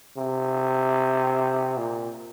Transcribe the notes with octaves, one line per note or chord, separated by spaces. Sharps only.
C3
A#2